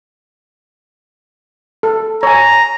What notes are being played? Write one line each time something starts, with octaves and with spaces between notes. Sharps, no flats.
A4
C#5 G#5 A#5